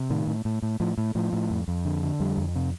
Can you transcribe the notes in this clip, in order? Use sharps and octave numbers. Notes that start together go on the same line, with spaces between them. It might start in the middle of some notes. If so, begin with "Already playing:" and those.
Already playing: C3
A2 D#3
A2
A2
A2
A2 F3
A2
A2 F3
A2
F2
F2
D3
D3
F2 G3
F2
C3